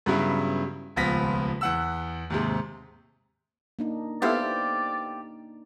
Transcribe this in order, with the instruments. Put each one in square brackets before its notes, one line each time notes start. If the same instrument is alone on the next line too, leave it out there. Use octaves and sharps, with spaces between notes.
[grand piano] G2 C#3 F#3 B3 E4
D#1 C#2 F3 B3 A#6 B6
E2 F#5 E6
D#2 G#2 C3
[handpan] A#3 D4 D#4
[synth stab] B3 E4 A4 [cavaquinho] G4 C5 F5 [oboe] D5